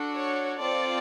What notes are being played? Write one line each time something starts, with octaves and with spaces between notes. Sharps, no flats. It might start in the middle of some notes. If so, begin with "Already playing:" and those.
Already playing: D4 F#4 A4
C#5
C4 F4 A4 D5